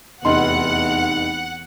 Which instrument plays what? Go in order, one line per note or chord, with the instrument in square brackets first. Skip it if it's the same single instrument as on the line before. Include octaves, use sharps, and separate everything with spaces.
[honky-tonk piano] F1 D#4 C6 [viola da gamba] E2 [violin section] F#5